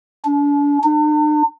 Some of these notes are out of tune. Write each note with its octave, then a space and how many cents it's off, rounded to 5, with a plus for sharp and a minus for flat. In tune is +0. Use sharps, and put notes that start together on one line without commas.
D4 -35
D4 +45